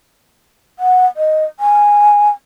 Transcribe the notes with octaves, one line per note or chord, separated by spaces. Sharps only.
F#5
D#5
G#5